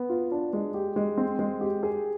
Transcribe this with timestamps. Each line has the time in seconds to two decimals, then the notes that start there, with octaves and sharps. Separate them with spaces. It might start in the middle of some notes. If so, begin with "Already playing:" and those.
Already playing: B3
0.09 F4
0.32 D4
0.53 G#3
0.74 G4
0.96 G#3
1.17 C4
1.39 G#3
1.61 G4
1.83 G#4